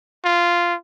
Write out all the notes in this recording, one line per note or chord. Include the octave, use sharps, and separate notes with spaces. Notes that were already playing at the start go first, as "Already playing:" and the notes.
F4